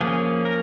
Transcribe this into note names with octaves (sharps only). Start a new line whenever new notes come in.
F3 A#3 C#4 G#4
A#4